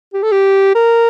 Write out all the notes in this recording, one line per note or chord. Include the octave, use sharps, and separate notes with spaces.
G4
A4
G4
A#4